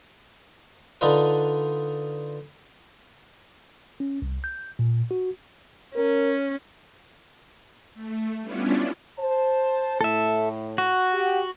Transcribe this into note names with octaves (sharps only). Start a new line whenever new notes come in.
D3 D4 D#4 F4 B4
C#4
C2
G6
A#2
F#4
C#4 A#4
A3
G3 B3 C#4 D4 E4 F4
C5 A5
A2 A4 E5
F#4
G4 F#5